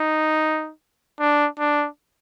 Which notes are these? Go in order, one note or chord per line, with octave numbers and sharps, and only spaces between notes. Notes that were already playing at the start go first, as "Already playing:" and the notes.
Already playing: D#4
D4
D4